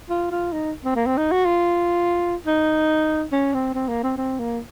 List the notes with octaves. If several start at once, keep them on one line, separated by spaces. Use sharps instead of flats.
F4
F4
D#4
C4
A#3
C4
D#4
F#4
F4
D#4
C#4
C4
C4
A#3
C4
C4
A#3